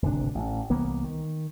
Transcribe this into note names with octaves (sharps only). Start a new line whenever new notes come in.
D1 G#1 C3 D4
A1
C2 E3 A#3 B3
D#3